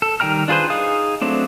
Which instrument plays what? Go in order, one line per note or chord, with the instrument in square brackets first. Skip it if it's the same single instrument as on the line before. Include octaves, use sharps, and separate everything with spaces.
[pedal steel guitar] A4
D#3 G3 G5 A#5 F6
D4 F4 G#4 B4 C5
D#4 G#4 F5 D#6
F#3 A3 C4 D4